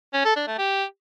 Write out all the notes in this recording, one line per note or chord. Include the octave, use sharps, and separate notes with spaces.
C#4
A4
D4
A3
G4